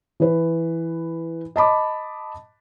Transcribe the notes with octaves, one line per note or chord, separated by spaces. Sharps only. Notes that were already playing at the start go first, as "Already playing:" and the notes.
E3 B4
D#5 A5 B5 D6